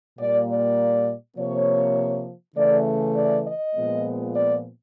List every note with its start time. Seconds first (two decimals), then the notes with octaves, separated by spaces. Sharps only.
0.18 A#2 G3 A#3 D5
0.48 D5
1.37 C3 F3 A#3 C#5
2.56 C#3 E3 A3 D5
3.15 D5
3.45 D#5
3.75 A#2 F3 G#3 B3
4.34 D5